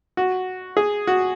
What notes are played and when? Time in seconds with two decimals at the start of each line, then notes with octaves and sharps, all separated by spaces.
0.17 F#4
0.77 G#4
1.07 F#4